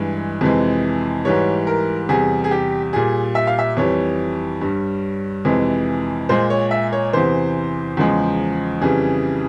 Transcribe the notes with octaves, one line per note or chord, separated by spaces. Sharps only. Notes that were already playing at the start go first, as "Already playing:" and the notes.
Already playing: G2 E3 G#3
F2 C3 E3 G#3
G#2 E3 G3 C#5
A#4
E2 C3 G3 G#4
G#4
G4
A#2 G3 G#4
E5
F5
E5
F2 E3 G3 C#5
G2 G3
F2 C3 E3 G#3
A#2 G#3 C5
C#5
E5
C#5
E2 C3 E3 C5
E2 C#3 F3 G#3
F2 C#3 E3 G3 G#4